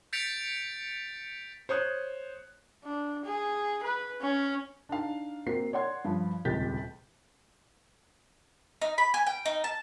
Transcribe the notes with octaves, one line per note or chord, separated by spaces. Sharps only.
G6 A6 B6 C#7 D7 F7
C5 C#5 D#6 F#6
D4
G#4
B4
C#4
D4 D#4 F5
A#3 C4 F#4 C7
C#5 D5 F#5 C6 G#6
G2 F3
D#1 C#2 C3 G6 A6 B6
D#4
B5
G#5
G5
D#4
A5